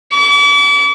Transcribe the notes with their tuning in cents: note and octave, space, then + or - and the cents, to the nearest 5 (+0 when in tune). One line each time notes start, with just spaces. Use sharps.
D6 -40